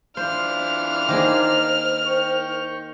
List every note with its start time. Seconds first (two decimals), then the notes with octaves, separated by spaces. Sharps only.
0.17 E3 D4 F4 C5 F6
1.08 D#3 A#3 G#4 C5
2.07 G5 C#6